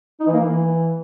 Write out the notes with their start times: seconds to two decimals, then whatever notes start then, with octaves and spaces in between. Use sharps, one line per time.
0.20 D#4
0.27 E3
0.33 A#3
0.40 E3